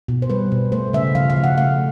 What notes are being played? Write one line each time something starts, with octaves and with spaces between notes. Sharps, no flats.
B2
C5
G3 B4
B2
A3 C5
C#3 E5
F3 F5
F5
C#3
F#5
A3 F5